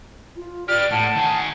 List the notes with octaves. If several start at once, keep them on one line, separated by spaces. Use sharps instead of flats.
F4
G4 B4 D5 F6
A2 F#5 A5
D#3 G#4